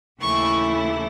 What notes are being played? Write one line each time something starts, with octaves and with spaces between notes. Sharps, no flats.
D#2 C#3 E3 A3 E4 C#6